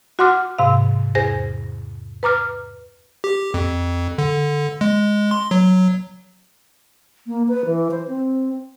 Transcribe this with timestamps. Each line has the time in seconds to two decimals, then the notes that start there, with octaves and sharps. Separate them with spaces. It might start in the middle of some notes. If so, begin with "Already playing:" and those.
0.19 F#4 F#5 C6 D6 F6
0.59 G#2 C3 F5
1.15 E2 G#4 C5 A#6
2.23 B4 A#5 D6 F6
3.24 G4
3.54 F2
4.18 D3
4.81 G#3
5.31 C6
5.51 F#3
7.27 A#3
7.48 B4
7.66 E3
7.91 C5
8.08 C4